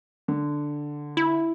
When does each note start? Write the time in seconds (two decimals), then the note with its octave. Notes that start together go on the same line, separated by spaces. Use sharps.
0.28 D3
1.17 E4